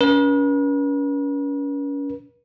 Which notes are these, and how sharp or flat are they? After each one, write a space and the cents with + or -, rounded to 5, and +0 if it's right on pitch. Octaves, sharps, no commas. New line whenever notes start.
C#4 +30 B4 -45